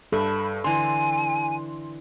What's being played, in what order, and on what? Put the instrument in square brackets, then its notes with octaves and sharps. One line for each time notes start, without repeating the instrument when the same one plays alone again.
[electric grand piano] G2 [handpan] A4 [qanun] B4 E5 [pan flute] B5
[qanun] D3 E3 [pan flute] G#5 [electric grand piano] C6